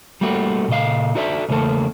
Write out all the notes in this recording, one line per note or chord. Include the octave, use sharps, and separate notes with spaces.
G3 A3 A#3 F#4
A#2 C#3 F4 D#5 F5
D#4 F#4 A4 D5 E5
E2 C#3 A3 A#3 A4 A5